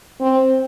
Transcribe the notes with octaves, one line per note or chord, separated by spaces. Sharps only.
C4